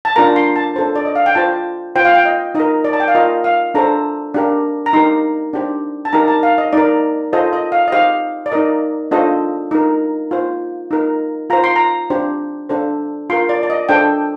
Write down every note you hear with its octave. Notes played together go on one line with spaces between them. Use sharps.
A5
D4 F4 A#4 A#5
C6
A5
D4 A4 C5
D5
D#5
F5
G5
F4 C5 A5
F4 C5 G5
F5
G5
D#5
D#4 D#5
A#4
D5
A5
G5
F5
F4 A#4 D#5
F5
D4 A4 C5 A#5
D4 G4 A#4
A#5
D#4 G4 A#4 C6
D4 G4 C5
A5
D#4 G4 A#4 A#5
A5
F5
D#5
D#4 A#4 D5
F4 A4 C5 D#5
D#5
F5
D#5
D#4 G4 C5 F5
D5
D#4 A#4 D#5
D4 F4 A4 C5 D#5
D#4 A#4
F4 C5
D#4 A#4
F4 C5 A#5
C6
A#5
D4 G4 C5
D4 A4 C5
F4 A#4 C6
D5
D5
D#5
D4 A4 C5 G5